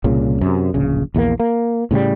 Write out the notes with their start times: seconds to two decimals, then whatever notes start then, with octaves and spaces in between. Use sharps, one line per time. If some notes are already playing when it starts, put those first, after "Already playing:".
0.04 C2 A#2 C#3
0.41 F#2 C3
0.74 D1 A#1 C#3
1.14 A#1 E2 G3 A#3
1.40 A#3
1.91 A2 C#3 F3 G3